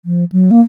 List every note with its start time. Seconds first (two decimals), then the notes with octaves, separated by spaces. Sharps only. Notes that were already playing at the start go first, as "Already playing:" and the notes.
0.05 F3
0.32 F#3
0.51 A#3